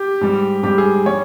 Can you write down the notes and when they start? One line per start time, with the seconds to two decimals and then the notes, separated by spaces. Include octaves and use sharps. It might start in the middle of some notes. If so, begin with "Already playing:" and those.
Already playing: G4
0.21 G#2 G3
0.63 G#2 G3 G4
0.78 G#4
1.06 G3 C#5